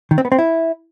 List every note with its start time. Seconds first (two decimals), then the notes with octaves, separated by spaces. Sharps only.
0.11 D#3
0.18 C4
0.25 B3
0.32 C4
0.38 E4